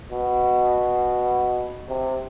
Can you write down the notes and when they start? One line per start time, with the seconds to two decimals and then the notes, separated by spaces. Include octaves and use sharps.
0.11 B2
1.89 C3